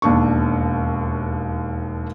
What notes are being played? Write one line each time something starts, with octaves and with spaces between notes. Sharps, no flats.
E1 D#2 D4 C#6